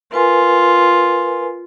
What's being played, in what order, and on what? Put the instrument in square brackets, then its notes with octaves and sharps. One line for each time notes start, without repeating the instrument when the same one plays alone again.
[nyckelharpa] F4 [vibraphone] A#4 B4 G#5